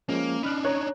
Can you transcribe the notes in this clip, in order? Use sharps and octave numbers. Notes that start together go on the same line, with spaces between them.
F3 G#3 A#3 C#4
D4 D#4 B5 F6 F#6
C#5 A#5 F#6